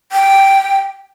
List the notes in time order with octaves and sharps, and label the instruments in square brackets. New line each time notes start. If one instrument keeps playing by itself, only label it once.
[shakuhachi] G5